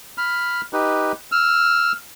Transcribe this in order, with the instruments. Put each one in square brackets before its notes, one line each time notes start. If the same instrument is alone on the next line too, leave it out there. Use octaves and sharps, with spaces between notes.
[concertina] B5 F6
D#4 G4 B4
E6 F6